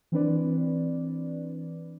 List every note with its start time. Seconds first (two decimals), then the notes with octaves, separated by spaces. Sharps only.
0.12 E3 C4 D4 B4 D5